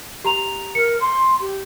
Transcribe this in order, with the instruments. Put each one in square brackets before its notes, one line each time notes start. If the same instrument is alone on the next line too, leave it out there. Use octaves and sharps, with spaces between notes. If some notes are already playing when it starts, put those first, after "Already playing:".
[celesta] G4 A#5 F7
[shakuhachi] A#4 [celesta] C#7
[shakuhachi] C6
G4